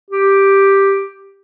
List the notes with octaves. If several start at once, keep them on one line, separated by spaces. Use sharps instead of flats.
G4